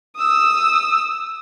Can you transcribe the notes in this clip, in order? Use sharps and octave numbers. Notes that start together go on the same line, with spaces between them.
D#6 E6